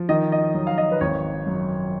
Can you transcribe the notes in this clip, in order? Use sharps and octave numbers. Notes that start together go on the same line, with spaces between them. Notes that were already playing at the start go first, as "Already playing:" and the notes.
Already playing: F3
D#3 D#5
D#5
F#3
F5
D#5
B4
G#1 C#5
F#2